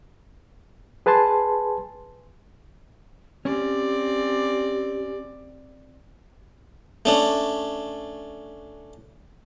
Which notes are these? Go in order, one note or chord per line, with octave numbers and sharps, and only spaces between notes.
G#4 B4 G#5 A5 C6
C4 C#4 G4 D5
A3 C#4 D4